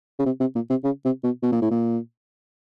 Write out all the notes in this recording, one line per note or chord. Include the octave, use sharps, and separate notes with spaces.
C#3
C3
C3
A#2
C3
C#3
C3
B2
B2
A#2
A2
A#2